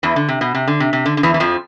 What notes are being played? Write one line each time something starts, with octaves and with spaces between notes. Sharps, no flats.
E2 E3
D3
C3
B2
C3
D3
C3
C3
D3
D3
E2 E3
E3
F2 F3